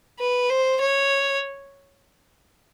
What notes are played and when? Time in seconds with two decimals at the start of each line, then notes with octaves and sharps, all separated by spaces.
0.19 B4
0.50 C5
0.81 C#5